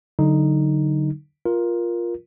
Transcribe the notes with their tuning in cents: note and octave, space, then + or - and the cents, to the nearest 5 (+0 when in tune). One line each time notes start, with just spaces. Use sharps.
D3 +0 F#3 +30 D#4 +0
F4 +0 A#4 +15